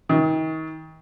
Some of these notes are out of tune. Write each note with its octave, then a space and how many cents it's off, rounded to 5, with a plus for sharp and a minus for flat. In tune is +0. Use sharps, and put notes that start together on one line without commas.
D#3 +35